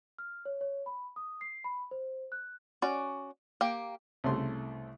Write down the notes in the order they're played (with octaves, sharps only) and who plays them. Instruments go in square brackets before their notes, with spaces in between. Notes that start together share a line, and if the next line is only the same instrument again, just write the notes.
[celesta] F6
C#5
C#5
B5
D#6
C7
B5
C5
F#6
[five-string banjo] C#4 F#4 D5
A#3 G4 G5
[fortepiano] C2 C#3 A3 C6